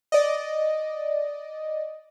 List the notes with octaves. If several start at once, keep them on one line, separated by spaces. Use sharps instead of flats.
D5 D#5